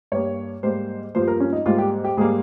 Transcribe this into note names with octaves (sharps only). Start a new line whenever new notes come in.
G2 G3 A#3 C#5
G#2 G3 A#3 C5
G2 F3 A#3 C5
A#4
C#4
D#4
G#2 G3 A#3 F4
G4
G4
G#2 G3 A#3 G#4